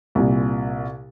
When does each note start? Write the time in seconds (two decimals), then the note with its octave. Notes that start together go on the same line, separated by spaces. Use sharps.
0.15 C2 A#2